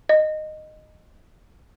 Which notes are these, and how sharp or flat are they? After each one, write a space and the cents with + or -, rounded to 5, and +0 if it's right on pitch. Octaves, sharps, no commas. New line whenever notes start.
D#5 -10